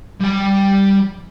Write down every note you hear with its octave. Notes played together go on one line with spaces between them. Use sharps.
G3 G5